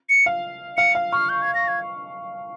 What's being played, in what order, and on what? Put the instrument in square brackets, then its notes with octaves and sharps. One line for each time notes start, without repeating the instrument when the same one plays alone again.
[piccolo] C#7
[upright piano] F5
[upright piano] F5 [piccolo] C#7
[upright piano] F5
[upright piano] C#6 [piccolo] F6
[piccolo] G6
G#6
A#6
G#6